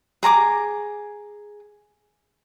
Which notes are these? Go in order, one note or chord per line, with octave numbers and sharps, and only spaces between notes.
G#4 A#5 C6 D6